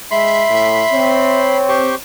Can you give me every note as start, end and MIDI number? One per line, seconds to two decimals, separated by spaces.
0.11 0.44 56
0.11 1.40 76
0.11 1.57 83
0.11 1.57 84
0.50 0.83 45
0.92 1.92 60
0.92 1.98 73
1.69 1.95 67
1.69 1.95 72
1.69 1.95 85